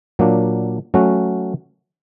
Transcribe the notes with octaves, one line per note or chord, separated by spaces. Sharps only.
A#2 F#3 A#3 D4
F#3 A3 C#4 F#4